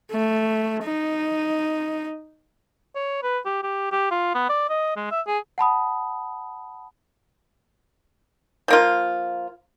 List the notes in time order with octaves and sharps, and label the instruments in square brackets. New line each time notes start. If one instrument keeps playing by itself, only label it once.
[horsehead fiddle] A3
D#4
[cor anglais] C#5
B4
G4
G4
G4
F4
B3
D5
D#5
G#3
E5
G#4
[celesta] F#5 A5 B5 D#6
[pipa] F3 A#3 F4